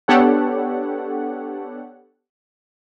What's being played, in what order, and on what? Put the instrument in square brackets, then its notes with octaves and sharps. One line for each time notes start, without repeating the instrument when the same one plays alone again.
[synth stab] B3 D4 G4 A4 C#5 F#5